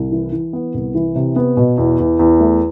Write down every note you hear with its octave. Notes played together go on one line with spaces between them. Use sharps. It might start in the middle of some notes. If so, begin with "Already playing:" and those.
Already playing: C2
E3
E3
B3
C2
E3
C3
B3
B2
E2
E2
E2
A3